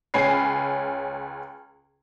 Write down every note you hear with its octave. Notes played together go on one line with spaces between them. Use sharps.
C#2 C#4 G#5 B5 C7